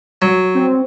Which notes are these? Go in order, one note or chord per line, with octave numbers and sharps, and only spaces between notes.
F#3
C4